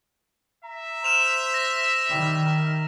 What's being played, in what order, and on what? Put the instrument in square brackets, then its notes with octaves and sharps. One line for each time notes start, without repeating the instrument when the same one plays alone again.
[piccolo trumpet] E5 [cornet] A#5
[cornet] C5 [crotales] F6 E7 F7
[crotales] A#6
[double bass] D#3 [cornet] G3
[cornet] A#4